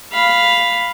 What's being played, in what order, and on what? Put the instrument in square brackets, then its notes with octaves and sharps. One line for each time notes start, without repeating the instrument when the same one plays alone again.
[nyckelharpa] F5 B5